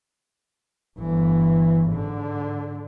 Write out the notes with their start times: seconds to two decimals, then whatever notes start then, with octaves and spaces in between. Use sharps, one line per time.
0.99 G1 E3
1.88 G#2 D3